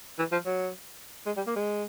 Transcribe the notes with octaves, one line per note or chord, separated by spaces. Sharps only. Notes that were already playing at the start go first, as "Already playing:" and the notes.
E3
F3
F#3
G#3
G3
A#3
G#3